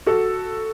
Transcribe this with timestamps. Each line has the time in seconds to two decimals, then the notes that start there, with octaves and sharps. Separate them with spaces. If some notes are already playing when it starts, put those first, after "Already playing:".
0.06 F#4 A4